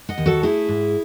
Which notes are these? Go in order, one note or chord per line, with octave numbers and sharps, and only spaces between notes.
D#5 F#5
D#2
F#4 A4
A3 E4 G#4
G#2